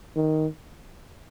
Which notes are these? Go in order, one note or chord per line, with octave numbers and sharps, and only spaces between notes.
D#3